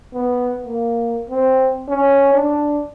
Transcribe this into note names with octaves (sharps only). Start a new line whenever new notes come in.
B3
A#3
C4
C#4
D4